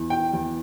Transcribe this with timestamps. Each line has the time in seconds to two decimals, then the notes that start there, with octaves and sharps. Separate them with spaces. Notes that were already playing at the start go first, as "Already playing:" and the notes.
Already playing: E2
0.10 G5
0.33 E2